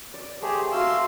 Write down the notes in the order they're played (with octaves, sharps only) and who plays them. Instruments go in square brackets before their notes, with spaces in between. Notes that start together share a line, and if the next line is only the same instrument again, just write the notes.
[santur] D5
[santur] A3 C5 C6 [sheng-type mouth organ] G4 G#4
[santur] A3 F#4 D6 [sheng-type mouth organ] F5 C6 E6